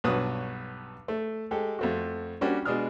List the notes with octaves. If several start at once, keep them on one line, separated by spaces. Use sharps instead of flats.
B1 G2 F#4 B4 C#5 D#6
A3
G#3 G4 A4
F2 A3 F#4
G3 A#3 C#4 D4 F#4 G4
B2 G#3 D4 D#6 F6